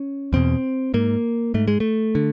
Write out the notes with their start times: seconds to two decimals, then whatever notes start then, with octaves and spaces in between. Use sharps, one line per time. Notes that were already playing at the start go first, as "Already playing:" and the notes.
Already playing: C#4
0.33 E2 B2 C4
0.94 G#2 A#3
1.54 G#2 A3
1.68 G#3
1.80 A3
2.15 D3